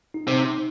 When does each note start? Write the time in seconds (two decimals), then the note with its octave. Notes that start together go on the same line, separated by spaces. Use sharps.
0.14 D#4
0.27 C3
0.40 D#4